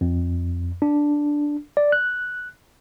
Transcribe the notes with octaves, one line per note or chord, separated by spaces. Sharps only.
F2
D4
D5
F#6